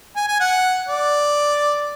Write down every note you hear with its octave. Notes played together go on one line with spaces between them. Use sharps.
G#5
G#5
F#5
D5